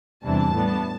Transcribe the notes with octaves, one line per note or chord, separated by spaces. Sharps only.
E2 C3 E3 G3 D4 A5
A2 G3 B3 D4